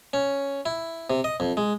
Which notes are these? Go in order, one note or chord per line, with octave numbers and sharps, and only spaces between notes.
C#4
E4
C3
D#5
F2
G#3